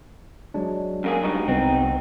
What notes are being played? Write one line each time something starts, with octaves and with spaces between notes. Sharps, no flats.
F#3 G#3 D4
F#2 A#3 G#4
G2 B2 D#4
C2 B3 C4 D#4